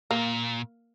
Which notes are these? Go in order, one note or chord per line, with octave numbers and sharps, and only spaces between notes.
A#2 A#3